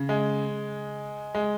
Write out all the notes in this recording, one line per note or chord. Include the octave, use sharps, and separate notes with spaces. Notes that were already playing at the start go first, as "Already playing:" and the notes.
Already playing: C#3
G#3
G#3